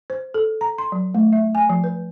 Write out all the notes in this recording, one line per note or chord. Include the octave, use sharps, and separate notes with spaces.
C5
A4
A#5
C6
F#3
A3
E5
G#5
F3
B4